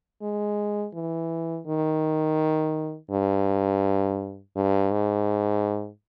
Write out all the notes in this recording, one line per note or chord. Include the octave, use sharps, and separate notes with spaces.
G#3
E3
D#3
G2
G2
G#2